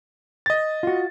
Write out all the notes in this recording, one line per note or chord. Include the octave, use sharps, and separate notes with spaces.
D#5 A6
F4 F#4